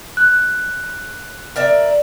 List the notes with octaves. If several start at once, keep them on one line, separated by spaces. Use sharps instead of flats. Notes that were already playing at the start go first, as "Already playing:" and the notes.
F#6
A#4 D5 E5